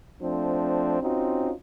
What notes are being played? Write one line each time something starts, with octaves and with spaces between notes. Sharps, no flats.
F3 A3 C4 D4
C4 C#4 D#4 F4 F#4